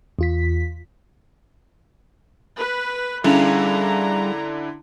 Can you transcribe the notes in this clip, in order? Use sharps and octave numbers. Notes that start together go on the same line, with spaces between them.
E2 F4 B6
B4
D3 G3 C#4 D4 E4 G#4 F5 A#5